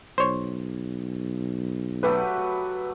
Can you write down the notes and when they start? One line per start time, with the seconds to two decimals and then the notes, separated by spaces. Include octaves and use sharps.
0.18 B1 C5 C#5
2.03 F#3 A3 G4 B4